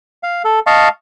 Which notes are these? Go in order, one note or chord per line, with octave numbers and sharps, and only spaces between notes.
F5
A4
D#5 F5 A5 C#6